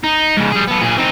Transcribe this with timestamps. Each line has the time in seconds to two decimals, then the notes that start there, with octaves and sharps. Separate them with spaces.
0.04 D#4
0.37 G#2 C#3
0.51 G3 G#4
0.67 B3 A4
0.81 A#2 G#4
0.97 C4 D#4